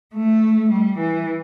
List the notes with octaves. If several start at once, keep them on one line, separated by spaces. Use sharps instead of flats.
A3
G3
E3